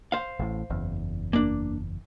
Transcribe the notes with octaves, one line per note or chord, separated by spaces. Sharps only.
C5 F5
A1 A2
F#1 E2
A#3 D4